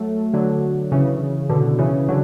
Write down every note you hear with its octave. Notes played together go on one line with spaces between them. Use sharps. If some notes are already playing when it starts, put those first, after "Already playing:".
Already playing: F#3 A3
D3 F#3
C#3 E3
B2 D3
C#3 E3
D3 F#3